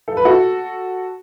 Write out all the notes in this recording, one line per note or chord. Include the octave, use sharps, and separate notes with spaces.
A4
B4
F#4 A4